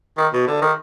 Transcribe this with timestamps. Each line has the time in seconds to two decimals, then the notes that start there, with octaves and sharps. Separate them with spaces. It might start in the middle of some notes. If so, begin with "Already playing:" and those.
0.18 D#3
0.33 B2
0.47 D3
0.62 D#3